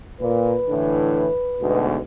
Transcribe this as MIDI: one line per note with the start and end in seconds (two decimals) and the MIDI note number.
0.21 0.57 46
0.21 1.90 71
0.69 1.29 45
0.69 1.29 50
0.69 1.29 52
1.61 1.99 38
1.61 1.99 44
1.61 1.99 47